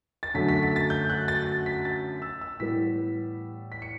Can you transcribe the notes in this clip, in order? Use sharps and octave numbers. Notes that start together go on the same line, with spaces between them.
A6
F#2 D3 F#3 A3 B6
B6
B6
A6
G6
F#6
A6
A6
B6
A6
E6
E6
A2 E3 G3 B3 B6
B6
C#7